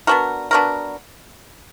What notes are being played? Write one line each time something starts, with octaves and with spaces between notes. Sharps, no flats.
B3 D4 F#4 A#4
B3 D4 F#4 A#4